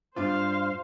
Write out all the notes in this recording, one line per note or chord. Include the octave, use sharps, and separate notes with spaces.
G2 D4 F4 C5 F5